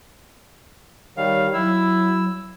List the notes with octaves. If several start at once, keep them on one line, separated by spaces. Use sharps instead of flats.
D#3 G3 C#5 F5
F#3 E4 E6